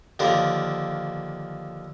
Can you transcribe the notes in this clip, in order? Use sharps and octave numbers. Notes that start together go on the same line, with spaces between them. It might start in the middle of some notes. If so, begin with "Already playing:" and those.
D#2 D3 F3 A#4